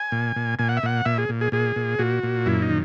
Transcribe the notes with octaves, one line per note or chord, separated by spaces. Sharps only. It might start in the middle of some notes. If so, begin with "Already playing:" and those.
Already playing: G#5
A#2
A#2
A#2 G#5
F#5
E5
A#2 F#5
A#2 E5
G#4
A#2
G#4
A#2 G#4
A#2
A#2 F#4
A#2
F#2 E4
D#4
D#3